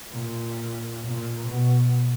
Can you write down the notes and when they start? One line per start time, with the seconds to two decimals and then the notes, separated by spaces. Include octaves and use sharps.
0.12 A#2
1.07 A#2
1.48 B2